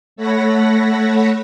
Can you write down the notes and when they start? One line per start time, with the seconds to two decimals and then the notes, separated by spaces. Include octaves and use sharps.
0.16 A3 A4 C#5 F#5 B5 A#6